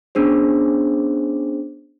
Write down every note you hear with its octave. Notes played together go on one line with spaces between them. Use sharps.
B3 C#4 D4 G#4 C5